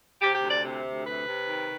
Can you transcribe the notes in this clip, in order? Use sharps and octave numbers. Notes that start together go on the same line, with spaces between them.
C3 G4
G4
D2
D5
C3
D2
C3 B4
C3
D#3